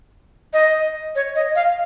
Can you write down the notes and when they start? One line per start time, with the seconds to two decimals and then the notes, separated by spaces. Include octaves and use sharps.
0.53 D#5
1.15 C#5
1.35 D#5
1.55 F5